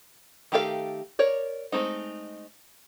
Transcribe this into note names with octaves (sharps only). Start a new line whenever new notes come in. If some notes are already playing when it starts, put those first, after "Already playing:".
D#3 A3 G4 A4 F5
A#4 C#5 D5
G#3 A3 C4 D#4